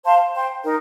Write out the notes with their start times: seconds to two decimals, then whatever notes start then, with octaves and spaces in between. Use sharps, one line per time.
0.04 C5 F5 A5 C6
0.34 C5 G5 C6
0.64 D#4 A#4